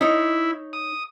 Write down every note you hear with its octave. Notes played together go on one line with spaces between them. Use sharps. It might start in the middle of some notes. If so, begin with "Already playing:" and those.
D#4 E4 C#5
D#6